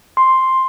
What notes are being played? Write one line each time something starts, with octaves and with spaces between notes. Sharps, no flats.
C6